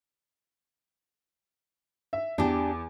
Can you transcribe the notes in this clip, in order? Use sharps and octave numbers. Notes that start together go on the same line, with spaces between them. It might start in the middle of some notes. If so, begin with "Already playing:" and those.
E5
E2 D4 G4